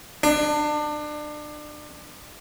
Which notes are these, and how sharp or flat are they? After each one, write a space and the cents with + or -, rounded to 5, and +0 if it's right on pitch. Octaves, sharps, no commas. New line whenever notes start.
D4 +30